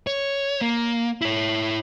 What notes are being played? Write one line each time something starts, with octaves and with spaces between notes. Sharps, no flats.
C#5
A#3
E4 C#5